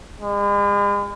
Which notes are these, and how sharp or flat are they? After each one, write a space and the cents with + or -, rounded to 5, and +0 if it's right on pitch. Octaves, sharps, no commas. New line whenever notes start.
G#3 -45